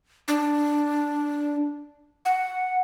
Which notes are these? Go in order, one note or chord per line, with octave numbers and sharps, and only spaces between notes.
D4
F#5